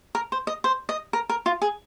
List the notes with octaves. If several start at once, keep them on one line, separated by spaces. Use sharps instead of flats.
A#4
C5
D#5
C5
D#5
A#4
A#4
F4
G#4